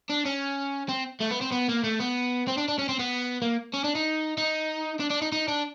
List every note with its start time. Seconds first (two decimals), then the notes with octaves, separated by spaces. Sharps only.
0.10 D4
0.26 C#4
0.89 C4
1.20 A3
1.31 B3
1.41 C4
1.51 B3
1.68 A#3
1.83 A3
2.00 B3
2.48 C4
2.57 D4
2.68 D4
2.79 C#4
2.89 C4
3.00 B3
3.42 A#3
3.73 C#4
3.84 D4
3.95 D#4
4.38 D#4
5.00 D4
5.11 D4
5.22 D#4
5.32 D#4
5.48 D4